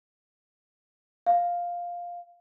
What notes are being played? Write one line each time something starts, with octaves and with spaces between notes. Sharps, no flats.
F5